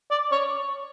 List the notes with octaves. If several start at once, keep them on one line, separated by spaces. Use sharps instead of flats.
D5
C#5